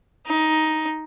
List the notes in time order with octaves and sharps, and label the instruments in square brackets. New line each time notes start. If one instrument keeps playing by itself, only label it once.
[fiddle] D#4